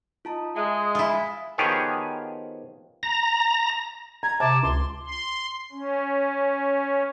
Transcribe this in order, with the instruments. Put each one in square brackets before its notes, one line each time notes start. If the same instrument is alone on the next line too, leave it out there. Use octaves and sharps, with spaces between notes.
[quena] D#4 [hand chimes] F4 A5 A#5
[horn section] G#3 [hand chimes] E5 G#5 [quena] D#6
[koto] E4 F4
[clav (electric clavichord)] D#3 F3 B3 G4 G#4 C#5
[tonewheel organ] A#5
[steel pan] A#5 [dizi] G#6
[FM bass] C3 [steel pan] A5 [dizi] D6
[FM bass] C#2 [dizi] C6
[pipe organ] C6
C#4